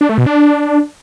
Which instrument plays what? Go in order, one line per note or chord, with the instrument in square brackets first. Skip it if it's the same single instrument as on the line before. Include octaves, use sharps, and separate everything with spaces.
[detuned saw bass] D4
A3
B2
D4